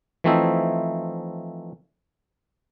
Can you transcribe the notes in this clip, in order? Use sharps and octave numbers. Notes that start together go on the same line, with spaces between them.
E3 F3 A3 C4 D#4 E4